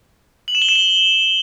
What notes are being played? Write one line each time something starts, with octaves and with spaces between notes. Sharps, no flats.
F#7
E7
G7
E7
G7